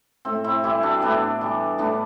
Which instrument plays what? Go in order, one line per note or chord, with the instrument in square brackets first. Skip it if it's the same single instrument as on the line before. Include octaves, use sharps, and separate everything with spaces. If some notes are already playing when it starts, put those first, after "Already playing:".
[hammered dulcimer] A2 C4
C4 E4
E3 G3 E4 G4
D4 F#4
A2 B3 D4
E3 G3
A2 B3 D4